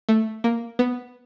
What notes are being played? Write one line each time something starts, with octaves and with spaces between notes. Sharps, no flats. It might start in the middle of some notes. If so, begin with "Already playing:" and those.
A3
A#3
B3